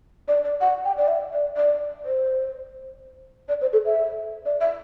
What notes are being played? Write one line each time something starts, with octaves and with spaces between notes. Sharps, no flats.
D5
D5
F#5
G5
D5
E5
D5
D5
C5
D5
C5
A4
E5
D5
E5